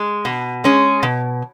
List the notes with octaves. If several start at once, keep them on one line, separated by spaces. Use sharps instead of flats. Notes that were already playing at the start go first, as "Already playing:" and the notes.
Already playing: G#3
B2
G#3 C#4 G#4
B2